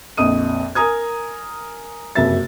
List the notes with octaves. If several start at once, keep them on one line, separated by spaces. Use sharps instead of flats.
A#1 F2 D#5 D#6 D#7
A#4 G#5 A#5 D#6 G#6
F#1 F2 C3 F#3 E5 A6